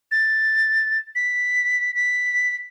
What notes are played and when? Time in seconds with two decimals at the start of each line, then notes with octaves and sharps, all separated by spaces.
0.12 A6
1.15 B6
1.95 B6